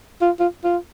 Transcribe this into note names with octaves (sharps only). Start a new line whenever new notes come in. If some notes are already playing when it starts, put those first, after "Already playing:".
F4
F4
F4